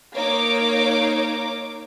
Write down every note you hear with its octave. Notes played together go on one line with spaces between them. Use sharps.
A#3 D#4 C#5 D6